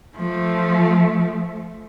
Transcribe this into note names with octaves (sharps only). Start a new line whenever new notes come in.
F3 A3